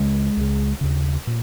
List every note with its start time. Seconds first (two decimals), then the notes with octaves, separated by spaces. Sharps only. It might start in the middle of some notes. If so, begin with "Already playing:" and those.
Already playing: C#2 C#3 G#3
0.37 C#2 C#3
0.81 D#2 C#3
1.27 A#2